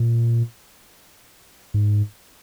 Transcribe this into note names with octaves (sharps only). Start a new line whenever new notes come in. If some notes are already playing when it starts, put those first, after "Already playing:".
Already playing: A#2
G#2